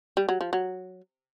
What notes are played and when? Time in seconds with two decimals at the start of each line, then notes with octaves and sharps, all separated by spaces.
0.17 G3
0.29 F#3
0.41 F3
0.53 F#3